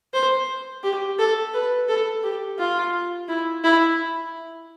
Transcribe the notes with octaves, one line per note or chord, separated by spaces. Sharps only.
C5
G4
A4
B4
A4
G4
F4
E4
E4